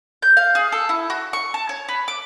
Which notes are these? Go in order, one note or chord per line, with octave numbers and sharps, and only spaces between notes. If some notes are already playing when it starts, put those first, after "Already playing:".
G6
F5
G#4
A4
E4
F#4
C#6
A5
C#5
B4
D6